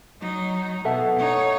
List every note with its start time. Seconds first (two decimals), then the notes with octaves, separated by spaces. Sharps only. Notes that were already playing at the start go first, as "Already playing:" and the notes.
0.21 F#3 D#4
0.85 B2 A4 E5 F#5
1.19 D#4 C#5